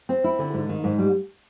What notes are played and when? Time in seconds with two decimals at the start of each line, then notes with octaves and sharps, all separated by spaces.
0.09 C4
0.24 E4
0.39 D3
0.54 G#2
0.69 D#3
0.84 G#2
0.98 G3